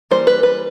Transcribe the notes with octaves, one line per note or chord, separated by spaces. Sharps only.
E3 G3 A#3 C5
B4
B4